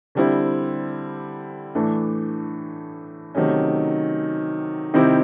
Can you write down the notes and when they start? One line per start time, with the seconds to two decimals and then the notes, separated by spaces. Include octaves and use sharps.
0.15 D3 G3 C4 E4
1.75 A2 E3 A3 D4
3.35 C3 D#3 F#3 A3 C#4
4.94 C3 D#3 G3 C4 E4